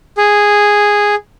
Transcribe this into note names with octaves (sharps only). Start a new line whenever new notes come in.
G#4